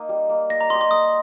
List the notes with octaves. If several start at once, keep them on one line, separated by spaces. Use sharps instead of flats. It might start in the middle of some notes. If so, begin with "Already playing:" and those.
Already playing: A#3 D#4
G3
A#3 D#4
A#3 A#6
A#5
G4 C5 D#5 C6
C6
A#3 D#6